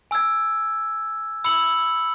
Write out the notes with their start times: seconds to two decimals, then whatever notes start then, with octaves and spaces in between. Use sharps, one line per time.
0.11 G#5 E6 G#6
1.44 B5 E6 C#7 F#7